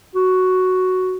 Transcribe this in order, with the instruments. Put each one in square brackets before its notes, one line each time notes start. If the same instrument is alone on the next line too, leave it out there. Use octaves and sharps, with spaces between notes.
[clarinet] F#4